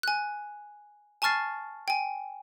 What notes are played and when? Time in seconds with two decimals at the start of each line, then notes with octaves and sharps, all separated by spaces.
0.03 G#5 F#6
1.22 G#5 A5 C#6 F6 A6 C7
1.88 G5 G#5